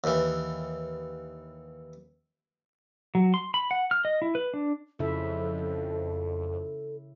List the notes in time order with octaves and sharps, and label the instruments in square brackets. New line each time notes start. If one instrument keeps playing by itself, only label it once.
[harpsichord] D#2 E3
[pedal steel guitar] F#3
C6
B5
F#5
F6
D#5
E4
B4
D4
[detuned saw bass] F2 [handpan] C#3 E4 E5 [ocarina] A4